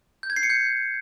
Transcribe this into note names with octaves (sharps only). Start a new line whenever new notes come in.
G6
G#6
C7
C#7
G6